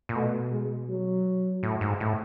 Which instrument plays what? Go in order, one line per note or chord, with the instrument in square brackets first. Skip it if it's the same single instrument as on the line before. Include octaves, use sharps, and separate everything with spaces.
[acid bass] A#2
[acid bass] B2 [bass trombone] A3
[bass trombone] G#3
F#3
[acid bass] A2
G#2
A2